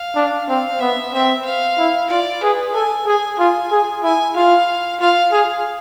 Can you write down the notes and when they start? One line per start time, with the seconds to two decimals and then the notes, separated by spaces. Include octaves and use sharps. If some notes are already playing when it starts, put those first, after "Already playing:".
Already playing: F5
0.16 D4
0.49 C4 F5
0.80 B3 E5
1.13 C4 E5
1.45 F5
1.78 E4
2.10 F4 D5
2.42 G#4 B4
2.74 A4 G#5
3.07 G#4 G#5
3.39 F4 G#5
3.71 G#4
4.03 E4 G#5
4.36 F4 F5
5.00 F4 F5
5.32 G#4 F5